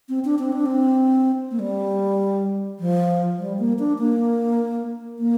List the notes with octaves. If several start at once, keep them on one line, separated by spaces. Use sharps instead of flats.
C4
D4
C4
D4
C4
A#3
G3
F3
G3
A#3
D4
A#3
A#3